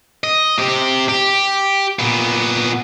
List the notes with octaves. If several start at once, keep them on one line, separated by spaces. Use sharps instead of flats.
D#5
C3 G4
G4
A#2 B3